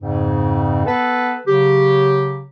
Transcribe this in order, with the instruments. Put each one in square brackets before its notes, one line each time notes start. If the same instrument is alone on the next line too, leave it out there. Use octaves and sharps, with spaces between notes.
[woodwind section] F2 G#2 C#3
B3 A4 B4
C#3 F#3 G4